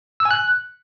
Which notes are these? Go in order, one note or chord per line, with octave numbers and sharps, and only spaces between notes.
E6
G#5
F#6